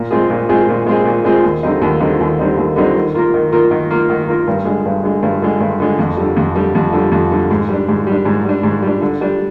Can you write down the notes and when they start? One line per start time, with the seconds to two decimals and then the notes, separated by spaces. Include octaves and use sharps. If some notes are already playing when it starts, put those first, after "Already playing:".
Already playing: A#2
0.11 G#3 C4 F4 G#4
0.30 A#2
0.49 G#3 C4 F4 G#4
0.69 A#2
0.86 G#3 C4 F4 G#4
1.05 A#2
1.25 G#3 C4 F4 G#4
1.43 D#2
1.63 D3 G3 C4 D#4
1.82 D#2
2.00 D3 G3 C4 D#4
2.20 D#2
2.39 D3 G3 C4 D#4
2.57 D#2
2.76 D3 G3 C4 D#4
2.95 D#3
3.14 A#3 F4 A#4
3.34 D#3
3.52 A#3 F4 A#4
3.71 D#3
3.90 A#3 F4 A#4
4.10 D#3
4.28 A#3 F4 A#4
4.48 G2
4.65 D3 G#3
4.85 G2
5.03 D3 G#3
5.23 G2
5.42 D3 G#3
5.60 G2
5.80 D3 G#3
5.99 F2
6.17 D3 G3
6.36 F2
6.55 D3 G3
6.75 F2
6.93 D3 G3
7.12 F2
7.31 D3 G3
7.51 G#2
7.69 G3 D4
7.89 G#2
8.07 G3
8.12 D4
8.25 G#2
8.45 G3 D4
8.63 G#2
8.82 G3 D4
9.02 D3
9.21 G3 D4